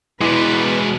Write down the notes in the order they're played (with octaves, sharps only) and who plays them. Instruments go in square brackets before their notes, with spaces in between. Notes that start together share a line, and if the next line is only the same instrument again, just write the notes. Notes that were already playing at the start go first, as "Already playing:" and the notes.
[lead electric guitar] E2 B2 [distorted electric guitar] G#3 D5 [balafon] E4 [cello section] B4